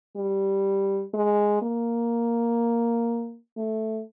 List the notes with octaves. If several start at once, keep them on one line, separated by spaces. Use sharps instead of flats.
G3
G#3
A#3
A3